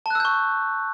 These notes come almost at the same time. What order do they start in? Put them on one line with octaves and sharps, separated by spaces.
A5 F#6 E6 G6 C#6